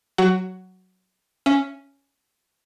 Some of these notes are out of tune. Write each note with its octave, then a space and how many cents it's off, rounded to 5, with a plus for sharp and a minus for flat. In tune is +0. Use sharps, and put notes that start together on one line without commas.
F#3 +5 F#4 +20
C#4 +0 E5 +25